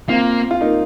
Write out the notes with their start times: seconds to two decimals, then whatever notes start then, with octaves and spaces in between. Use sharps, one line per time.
0.09 A#3 C4 F4
0.51 F4
0.61 A#3 D#4